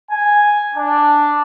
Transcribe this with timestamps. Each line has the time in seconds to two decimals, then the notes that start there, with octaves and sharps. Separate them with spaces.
0.11 G#5
0.75 D4